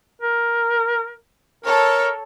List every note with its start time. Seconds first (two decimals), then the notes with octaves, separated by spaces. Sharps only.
0.22 A#4
1.65 A4 A#4 C#5